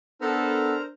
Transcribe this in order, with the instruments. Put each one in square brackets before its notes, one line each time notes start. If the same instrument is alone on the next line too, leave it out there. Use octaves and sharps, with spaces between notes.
[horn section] B3 A4 [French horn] D4 [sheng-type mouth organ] A#4 C5 A#5